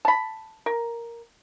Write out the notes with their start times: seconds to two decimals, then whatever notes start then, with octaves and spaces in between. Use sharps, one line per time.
0.05 A5 B5
0.66 A#4